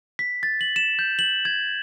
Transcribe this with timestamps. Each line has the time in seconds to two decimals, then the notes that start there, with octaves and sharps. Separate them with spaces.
0.19 B6
0.43 A6
0.61 F#7
0.76 E7
0.99 G6
1.19 F#7
1.45 G#6